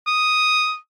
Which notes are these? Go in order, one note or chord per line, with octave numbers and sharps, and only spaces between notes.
D#6